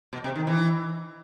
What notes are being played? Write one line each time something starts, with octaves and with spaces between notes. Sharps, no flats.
B2
C3
D#3
E3